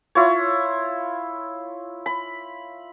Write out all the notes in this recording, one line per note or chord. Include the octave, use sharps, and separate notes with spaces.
E4 F4 C#5
B5